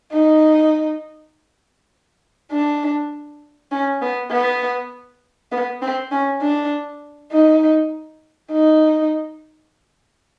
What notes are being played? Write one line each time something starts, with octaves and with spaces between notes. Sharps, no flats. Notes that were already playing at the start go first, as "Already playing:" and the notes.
D#4
D4
C#4
B3
B3
B3
C4
C#4
D4
D#4
D#4